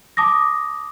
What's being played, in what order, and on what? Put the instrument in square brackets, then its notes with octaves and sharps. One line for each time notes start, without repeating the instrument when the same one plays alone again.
[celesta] A5 D6 D#6 A#6